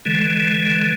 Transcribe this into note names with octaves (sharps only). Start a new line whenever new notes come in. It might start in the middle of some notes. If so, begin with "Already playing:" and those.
D3 E3 G#3